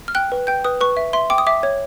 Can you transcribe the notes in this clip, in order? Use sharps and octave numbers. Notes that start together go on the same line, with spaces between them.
F6
G5 F#6
B4
G5 G6
B4 D#6
B4 C#6
E5
E5 C6
G5 D6
D#6
E5 D6
C#5